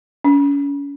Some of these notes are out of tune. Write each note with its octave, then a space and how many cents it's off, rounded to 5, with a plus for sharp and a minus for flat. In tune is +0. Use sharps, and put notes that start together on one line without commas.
C#4 +35